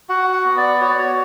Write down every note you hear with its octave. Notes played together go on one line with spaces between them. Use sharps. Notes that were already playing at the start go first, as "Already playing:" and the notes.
F#4 F#5
F#5
B3
D5
F#4 C#5
D5
C#5